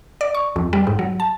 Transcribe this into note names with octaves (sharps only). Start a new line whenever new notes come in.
D5
C#6
F2
G3
G#2
F#3
A5